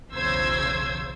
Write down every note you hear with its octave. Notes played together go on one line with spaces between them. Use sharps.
B1 E2 C#3 C5 E6 G#6